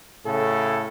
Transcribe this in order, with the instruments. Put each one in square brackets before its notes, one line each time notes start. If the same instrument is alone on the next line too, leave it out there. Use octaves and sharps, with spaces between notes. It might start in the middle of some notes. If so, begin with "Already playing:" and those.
[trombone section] A2 C#3 A4